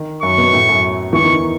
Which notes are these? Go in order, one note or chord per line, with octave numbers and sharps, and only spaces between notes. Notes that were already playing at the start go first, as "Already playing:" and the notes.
Already playing: D#3
F#2 F#3 C#6
B2 B3
A2 A3
F#2 F#3
E2 E3 C#6
D#3
D#3